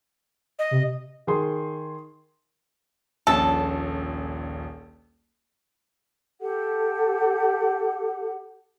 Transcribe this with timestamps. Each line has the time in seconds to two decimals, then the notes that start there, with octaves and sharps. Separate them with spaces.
0.59 D#5
0.71 C3
1.27 D#3 G#4 C6
3.27 D#1 A#1 C#4 A4
6.39 G4 A4 F#5